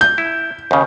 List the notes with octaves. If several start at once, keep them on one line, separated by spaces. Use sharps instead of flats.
G6
E4
D#2 C#3